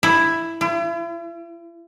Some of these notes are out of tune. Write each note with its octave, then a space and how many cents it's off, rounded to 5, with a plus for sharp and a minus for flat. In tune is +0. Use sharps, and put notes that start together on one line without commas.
E4 +5
E4 +45